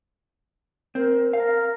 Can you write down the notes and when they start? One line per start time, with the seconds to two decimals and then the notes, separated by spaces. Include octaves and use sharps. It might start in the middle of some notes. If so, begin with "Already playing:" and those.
0.95 C4 A#4
1.33 A#4 F5